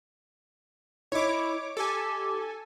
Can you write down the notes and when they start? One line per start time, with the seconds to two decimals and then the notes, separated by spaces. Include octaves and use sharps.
1.12 D#4 E4 C#5 D#5 D6
1.77 G4 A4 G#5